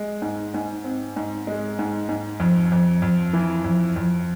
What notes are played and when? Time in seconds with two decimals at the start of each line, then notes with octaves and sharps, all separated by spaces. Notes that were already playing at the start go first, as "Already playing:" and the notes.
Already playing: G#3
0.22 G#2
0.54 G#2
0.84 C4
1.16 G#2
1.47 G#3
1.79 G#2
2.09 G#2
2.40 F2
2.72 F2
3.02 F2
3.33 E3
3.64 F2
3.96 F2